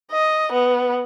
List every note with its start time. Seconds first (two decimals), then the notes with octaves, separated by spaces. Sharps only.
0.11 D#5
0.52 B3